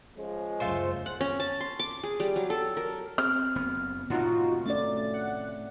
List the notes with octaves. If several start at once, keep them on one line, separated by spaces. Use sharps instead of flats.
C#3 F3 G#3
C#2 F#2 A3 F4 C5
F#5
C#4
A5
C6
D6
G#4
G3
F#3
A4
A#4
C4 F6
F#1 B3
A2 C3 D#3 D#4 F4 F#4
A3 C#4 D5 A6
F#5